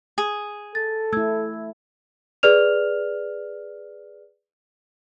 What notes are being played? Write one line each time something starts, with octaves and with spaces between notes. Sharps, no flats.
G#4
A4 A6
A3 E4 E6 G#6
G#4 B4 D5 F6 F7